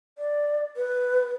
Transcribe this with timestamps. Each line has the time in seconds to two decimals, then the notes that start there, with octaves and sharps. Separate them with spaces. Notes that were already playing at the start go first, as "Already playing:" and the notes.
0.18 D5
0.77 B4